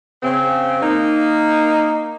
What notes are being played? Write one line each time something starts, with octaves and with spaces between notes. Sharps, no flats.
C#3 C4
A#3 D#4